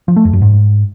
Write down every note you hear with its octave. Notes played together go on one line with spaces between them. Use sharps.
F3
A3
F2
F#2
G#2